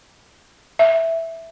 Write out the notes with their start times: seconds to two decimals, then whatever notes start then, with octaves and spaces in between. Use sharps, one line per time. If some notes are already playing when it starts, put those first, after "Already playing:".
0.79 E5